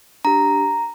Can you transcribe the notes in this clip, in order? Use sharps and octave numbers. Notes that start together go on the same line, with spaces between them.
D4 G4 A#5